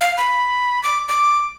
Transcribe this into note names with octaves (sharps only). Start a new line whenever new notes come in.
F5
B5
D6
D6